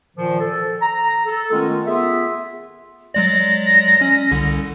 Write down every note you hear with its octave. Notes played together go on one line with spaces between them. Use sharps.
A#2 D#3 F3
A4
A#5
A4
D#3 G#3 A3 B3 C#4 F4
B3 F4 G#4 E5
F#3 G#3 D5 A#6
C#4
C2 D3